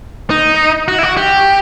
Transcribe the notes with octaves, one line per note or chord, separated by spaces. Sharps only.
D#4
F#4
E4
F#4
G4